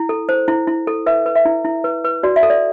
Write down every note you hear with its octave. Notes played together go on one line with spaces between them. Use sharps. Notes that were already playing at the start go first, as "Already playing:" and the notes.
Already playing: E4
A4
C5
E4
E4
A4
B4 E5
B4
E5
E4
E4
B4
B4
F#4 D5
E5
A4
D5